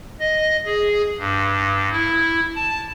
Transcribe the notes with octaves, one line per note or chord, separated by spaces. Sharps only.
D#5
G#4
G2
E4
A5